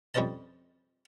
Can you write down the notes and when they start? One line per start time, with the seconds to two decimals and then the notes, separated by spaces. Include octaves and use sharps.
0.14 F2 G3 C#4 C5 D#5 A5